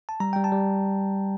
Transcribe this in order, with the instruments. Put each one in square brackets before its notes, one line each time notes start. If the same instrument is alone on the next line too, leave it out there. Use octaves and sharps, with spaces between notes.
[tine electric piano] A5
G3 A#5
G3 G5
A5
G3